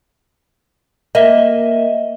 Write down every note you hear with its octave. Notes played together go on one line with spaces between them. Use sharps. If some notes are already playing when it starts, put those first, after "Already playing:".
A#3 D#5 E5